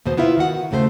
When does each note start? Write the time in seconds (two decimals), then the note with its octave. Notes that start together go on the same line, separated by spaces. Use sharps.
0.05 D#2 B2 B3 C5
0.17 B3 E4 F4 E5
0.37 D#3 F#4 F#5
0.71 D#2 C#3 A3 A#4 C5